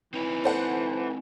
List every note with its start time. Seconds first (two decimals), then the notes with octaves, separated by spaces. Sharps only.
0.14 E3 C4 D#4 C#5
0.44 A4 C5 F#5